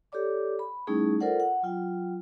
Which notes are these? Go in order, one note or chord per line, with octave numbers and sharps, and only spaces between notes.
G4 A4 C#5 D5 D6
B5
G3 A3 C#4 D#4 E4 G#4
F4 A4 A#4 C5 D5 F#5
F#5
F#3 F4 G5